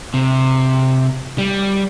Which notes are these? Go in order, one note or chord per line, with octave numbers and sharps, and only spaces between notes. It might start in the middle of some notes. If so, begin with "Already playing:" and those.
C3
G3